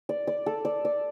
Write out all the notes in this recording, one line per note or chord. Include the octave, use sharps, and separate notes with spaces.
D5
D5
A4
D5
D5